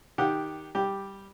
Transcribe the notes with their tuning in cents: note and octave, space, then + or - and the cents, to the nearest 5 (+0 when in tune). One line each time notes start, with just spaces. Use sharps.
D#3 +0 G4 +0 F#5 -10
G3 +0 G4 +0